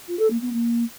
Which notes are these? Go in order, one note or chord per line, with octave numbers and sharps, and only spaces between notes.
F4
A4
A#3
B3
A#3